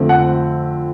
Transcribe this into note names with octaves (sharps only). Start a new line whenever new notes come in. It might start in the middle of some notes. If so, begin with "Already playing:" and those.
Already playing: F2 D3 F3 A3 C4
F#5